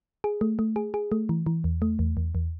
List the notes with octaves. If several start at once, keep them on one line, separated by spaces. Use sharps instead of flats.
G#4
A3
A3
G#4
G#4
A3
E3
E3
E2
A3
E2
E2
E2